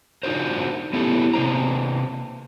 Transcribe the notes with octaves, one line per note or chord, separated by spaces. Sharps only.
D4 D#4 F4 F#4 A#4 C5
B3 C#4 E4 G4 A4
C3 A#3 C5 A#5